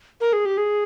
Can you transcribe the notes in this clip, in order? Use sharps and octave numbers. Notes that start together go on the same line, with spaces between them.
A#4
G#4
G4
G#4